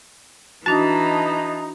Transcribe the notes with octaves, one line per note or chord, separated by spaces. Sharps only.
E3 D4 D#4 F#4 A5 A#5